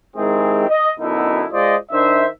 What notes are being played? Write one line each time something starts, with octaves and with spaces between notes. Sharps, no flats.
D#3 G#3 C4 E4 G4 G#4
D#5
F#2 B2 D3 D#4 E4
G#3 F4 C5 D5 D#5
D#3 D4 C5 E5